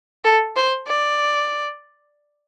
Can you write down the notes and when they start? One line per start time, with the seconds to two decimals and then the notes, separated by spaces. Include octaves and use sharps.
0.24 A4
0.56 C5
0.87 D5